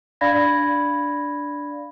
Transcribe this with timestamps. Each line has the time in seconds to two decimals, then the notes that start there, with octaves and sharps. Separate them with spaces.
0.21 D4 D5 F5 B5 G#6 A#6